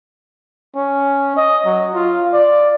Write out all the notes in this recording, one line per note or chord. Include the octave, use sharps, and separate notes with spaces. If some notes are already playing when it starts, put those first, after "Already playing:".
C#4
D#5
F#3
F4
D5